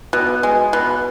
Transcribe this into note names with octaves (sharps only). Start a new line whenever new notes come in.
B2
G#3
B2